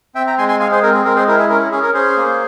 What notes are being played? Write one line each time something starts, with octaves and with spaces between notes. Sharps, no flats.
C4 E5 G5
G5 A#5
G#3 G#5 C6
G#5 C6
G#4 F5 G#5
G#4 C5
C4 A#4
G#4
G#3 A#4
G#4 C5
E4 A#4
G#4
C#4 A#4
C#4 G#4
A#4
C#4 G#4 C5
A#3